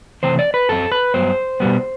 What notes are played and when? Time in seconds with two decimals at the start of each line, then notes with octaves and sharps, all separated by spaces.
0.23 C3 E3 A3 C4 C5
0.39 D5
0.54 B4
0.69 F#2 F#3 C4 A4
0.92 B4
1.14 G2 F#3 B3 C5
1.60 B2 G3 B3